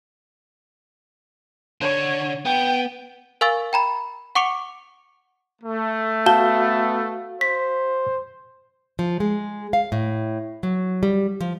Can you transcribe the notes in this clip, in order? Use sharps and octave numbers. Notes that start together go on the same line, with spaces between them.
D3 C#5
B3 G5
A#4 F5 G#5 C#6 E6 A6
G5 A#5 B5
F#5 C#6 D6 C#7 D7 F7
A3
B3 F#4 F5 A5 G6 G7
C5 B6
F3
G#3
F5
A2
F#3
G3
F3